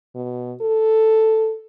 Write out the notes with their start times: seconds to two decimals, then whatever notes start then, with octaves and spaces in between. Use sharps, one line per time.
0.15 B2
0.61 A4